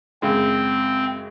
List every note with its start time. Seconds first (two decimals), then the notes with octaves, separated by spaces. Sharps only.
0.22 F#2 C#3 G#3 C4